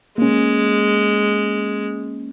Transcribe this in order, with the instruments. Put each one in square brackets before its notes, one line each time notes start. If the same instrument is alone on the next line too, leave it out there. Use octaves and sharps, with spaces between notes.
[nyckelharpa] G#3 [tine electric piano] A#3 C#4